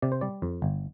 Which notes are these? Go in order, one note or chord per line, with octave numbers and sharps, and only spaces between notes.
C3 D5
C5
G3 D5
F2
G1